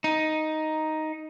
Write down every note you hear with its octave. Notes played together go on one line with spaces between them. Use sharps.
D#4